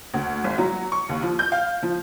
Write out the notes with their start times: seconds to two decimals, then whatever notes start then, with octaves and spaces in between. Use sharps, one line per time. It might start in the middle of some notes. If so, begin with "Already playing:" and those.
0.14 D2
0.44 G#1
0.58 F#3
0.92 C#6
1.09 D#2
1.22 F3
1.39 G6
1.52 F5
1.83 F3